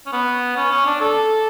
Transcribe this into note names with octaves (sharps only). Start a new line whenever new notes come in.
C#4
B3
C#4
C#4
D4
A4